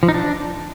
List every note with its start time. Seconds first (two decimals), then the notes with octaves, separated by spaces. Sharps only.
0.03 F3
0.08 D#4
0.14 D4